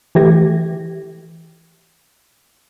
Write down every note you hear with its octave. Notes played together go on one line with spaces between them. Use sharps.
E3 A3 G4 G#6 A#6